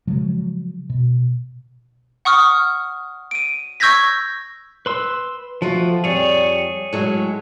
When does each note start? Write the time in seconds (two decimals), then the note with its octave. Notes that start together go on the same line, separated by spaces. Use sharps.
0.07 C#3 F3 F#3 G#3
0.90 B2
2.25 F#5 C#6 D#6 F6
3.31 D7 D#7
3.80 C#6 E6 G6 G#6 A#6 B6
4.86 B4 C6 E6
5.62 F3 A3 F4 F#4
6.04 F2 G3 G#4 C#5
6.93 A2 F#3 G#3